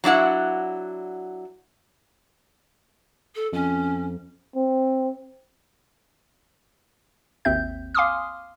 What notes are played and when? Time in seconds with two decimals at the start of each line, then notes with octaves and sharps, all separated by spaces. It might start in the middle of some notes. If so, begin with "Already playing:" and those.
0.04 F#3 D4 E4 F#5
3.34 A4
3.53 F2 C#4
4.56 C4
7.45 G#1 D#2 C4 E5 G6
7.94 F5 G#5 C6 D6 D#6 F6